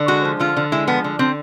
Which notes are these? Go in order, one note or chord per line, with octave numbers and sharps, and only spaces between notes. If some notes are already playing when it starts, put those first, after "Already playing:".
Already playing: D3
G#3 F#4
F3
D3 F4
D3
G#3 E4
F3 B3
D3
D3 C4